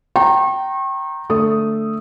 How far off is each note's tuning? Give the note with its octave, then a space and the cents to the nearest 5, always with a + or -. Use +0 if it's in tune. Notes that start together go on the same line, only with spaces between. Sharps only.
G5 -20 A#5 -10 C#6 -40
D3 +0 A3 +5 D#6 +0